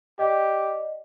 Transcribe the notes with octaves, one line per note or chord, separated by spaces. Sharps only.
G4 D5 D#5